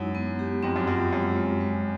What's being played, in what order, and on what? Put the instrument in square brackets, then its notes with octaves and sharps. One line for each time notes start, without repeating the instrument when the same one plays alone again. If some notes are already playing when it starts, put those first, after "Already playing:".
Already playing: [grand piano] F#2 [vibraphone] G#3 D#4 E4
[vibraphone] B3
G4
[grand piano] F2 [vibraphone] C4
[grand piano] F#2
[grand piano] F#2 [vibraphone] F4
[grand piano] F2
[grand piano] F#2 [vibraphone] G#3
[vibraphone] G#3
G#3